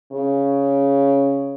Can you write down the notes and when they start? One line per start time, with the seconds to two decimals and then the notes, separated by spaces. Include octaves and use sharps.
0.12 C#3